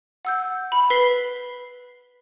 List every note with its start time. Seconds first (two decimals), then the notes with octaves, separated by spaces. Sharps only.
0.25 F#5 E6 G6
0.72 B5
0.90 B4 B6 C7 G7